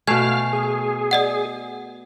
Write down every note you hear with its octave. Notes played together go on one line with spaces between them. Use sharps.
B2 A3 F5 G#5 F6 G#6 C7
G#4
D5 D#5 F#5